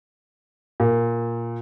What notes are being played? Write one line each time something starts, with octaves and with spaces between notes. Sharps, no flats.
A#2